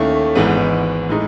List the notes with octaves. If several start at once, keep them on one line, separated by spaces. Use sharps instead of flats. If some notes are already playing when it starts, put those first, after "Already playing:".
Already playing: D#2 D#3 A3 C#4 E4
G#1 G#2 E3 B3
A2 G#3 D#4